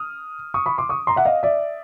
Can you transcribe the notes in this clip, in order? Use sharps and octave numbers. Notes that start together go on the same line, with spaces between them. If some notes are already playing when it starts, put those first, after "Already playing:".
Already playing: D#6 F6
C#6 D#6
B5 C#6
C6 D6
C#6 D#6
A#5 C6
E5 F#5
D#5 F5
D5 E5